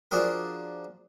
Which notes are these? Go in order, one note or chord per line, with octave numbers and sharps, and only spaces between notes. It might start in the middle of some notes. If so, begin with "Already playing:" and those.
F3 D4 F#4 G#4 A#4